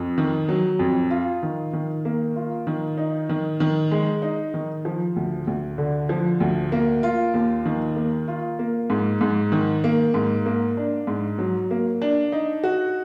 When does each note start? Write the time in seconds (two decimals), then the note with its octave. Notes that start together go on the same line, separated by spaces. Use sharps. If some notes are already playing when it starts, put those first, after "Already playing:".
Already playing: F2
0.18 D#3
0.49 F#3
0.79 F2
1.10 F4
1.43 D#3
1.73 D#3
2.05 A#3
2.36 F4
2.67 D#3
2.98 D#4
3.29 D#3
3.60 D#3
3.91 G#3
4.22 D#4
4.54 D#3
4.85 F3
5.16 D2
5.47 D2
5.78 D3
6.09 F3
6.40 D2
6.72 A#3
7.03 F4
7.34 D#2
7.65 D#3
7.96 A#3
8.28 F4
8.59 A#3
8.90 G#2
9.21 G#2
9.52 D#3
9.84 A#3
10.14 G#2
10.46 A#3
10.77 D4
11.07 G#2
11.39 F#3
11.71 A#3
12.02 D4
12.32 D#4
12.63 F#4